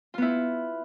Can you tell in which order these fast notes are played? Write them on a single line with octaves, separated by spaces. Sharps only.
F4 B3 E4